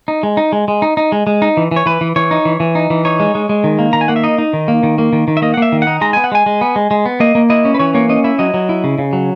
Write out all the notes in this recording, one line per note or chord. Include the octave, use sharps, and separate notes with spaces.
D#4
G#3
D#4
G#3
G#3
D#4
D#4
G#3
G#3
D#4
E3
E3 C#5
E3 B4
E3
E3 C#5
D#4
E3
E3
D#4
E3
D#4 C#5
G#3
G#3
G#3
D#3
A#3
D#3 A#5
G#5
A#3 F#5
E5
D#4 D#5
D#4
D#3
A#3
D#3
A#3
D#3
D#3
E5
A#3 D#5
F#5
A#3 E5
D#3
F#5
D#4
G#3 A#5
B3 G#5
F#5
G#3 G#5
G#3
B3
G#3
G#3
B3
A#3 D#5
A#3
E4 D#5
C#4
B4
E3 C#5
A#3 C#5
C#4 D#5
E4 E5
F#3 D#5
F#3
E4
C#3
C#3
F#3